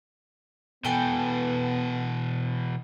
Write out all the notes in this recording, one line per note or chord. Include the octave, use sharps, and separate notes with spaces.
B2 E3 B3 A4 G5 G#5